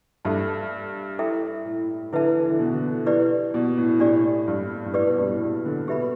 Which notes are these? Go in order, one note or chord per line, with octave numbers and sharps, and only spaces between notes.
G2 A4 E5 A5
E4 A4 E5 G5
A2
D3 E4 B4 E5 A5
E3
D3
B2
D3
E4 G4 B4 D5
B2
A2
A2 D4 G4 D5
G2
G2
A2 G4 B4 D5
B2
G2
A2
B2
D3
B2 G4 B4 E5 B5